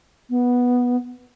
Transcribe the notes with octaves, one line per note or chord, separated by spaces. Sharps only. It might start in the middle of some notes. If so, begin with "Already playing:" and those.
B3